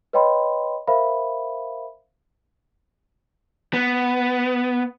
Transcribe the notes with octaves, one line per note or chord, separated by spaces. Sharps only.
B4 C#5 D#5 G5 B5 C6
A#4 C5 E5 F5 B5
B3